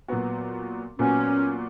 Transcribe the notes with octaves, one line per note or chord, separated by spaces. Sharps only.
A#2 F#3 B3 F#4
A#2 F#3 B3 C#4 F#4